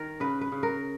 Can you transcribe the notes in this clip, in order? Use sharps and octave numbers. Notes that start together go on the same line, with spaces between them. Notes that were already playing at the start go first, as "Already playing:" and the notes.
Already playing: D#3 A#4
C#3 B4
B4
C#3
A#4